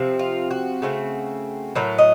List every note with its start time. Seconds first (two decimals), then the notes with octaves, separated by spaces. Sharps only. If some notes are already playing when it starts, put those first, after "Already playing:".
Already playing: C3 F3 C4
0.19 F4
0.51 F#4
0.82 C#3 A3 C4
1.75 A2 F#3 A3 A#4
1.98 D#5